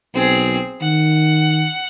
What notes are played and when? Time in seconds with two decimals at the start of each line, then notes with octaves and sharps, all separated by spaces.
0.15 B1 C4 G#4
0.82 D#3 F#5